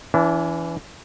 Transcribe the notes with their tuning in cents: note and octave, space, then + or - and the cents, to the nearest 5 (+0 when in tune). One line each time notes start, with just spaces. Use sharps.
E3 +15 D4 -40